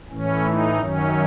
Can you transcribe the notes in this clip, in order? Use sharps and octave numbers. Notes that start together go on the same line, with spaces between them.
A2 E3 C#4
D#4
F#2 D#3 F#3 C#4